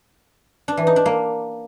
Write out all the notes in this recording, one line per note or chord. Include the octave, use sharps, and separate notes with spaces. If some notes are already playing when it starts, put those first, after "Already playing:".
D4
E3
D#4
D4
A#3